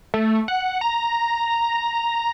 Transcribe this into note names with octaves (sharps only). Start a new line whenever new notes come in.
A3
F#5
A#5